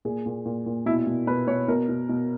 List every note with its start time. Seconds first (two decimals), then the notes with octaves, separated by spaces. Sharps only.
0.05 A#2 G#4
0.26 A#2
0.46 A#2
0.66 A#2
0.86 B2 E4
1.07 B2
1.27 B2 B4
1.48 B2 C#5
1.68 B2 A#4
1.89 B2
2.09 B2